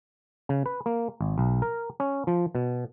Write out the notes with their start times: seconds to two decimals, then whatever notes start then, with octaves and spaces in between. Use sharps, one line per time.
0.49 C#3
0.66 B4
0.86 A#3
1.21 G#1
1.38 B1
1.62 A#4
2.00 C#4
2.27 F3
2.55 B2